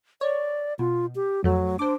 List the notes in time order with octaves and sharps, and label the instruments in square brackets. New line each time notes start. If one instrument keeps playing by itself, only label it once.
[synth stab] C#5 [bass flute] D5
[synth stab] B2 [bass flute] F4
[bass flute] G4
[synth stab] F2 A3 [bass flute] F#3
[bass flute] D4 [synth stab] C5 D6